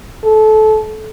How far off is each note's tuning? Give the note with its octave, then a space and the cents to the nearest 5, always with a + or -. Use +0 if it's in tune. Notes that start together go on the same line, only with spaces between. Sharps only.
A4 -25